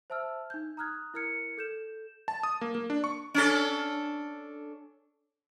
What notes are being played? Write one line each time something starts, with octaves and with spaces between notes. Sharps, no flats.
C5 E5 A5 E6 F6
D#4 G6
A#5 D#6 F6 F#6 G#6
E4 A#4 F6 G#6 C#7
A4 G6 E7
A5
D#6
A#3
A#3
D4
C#6
C#4 D4 A4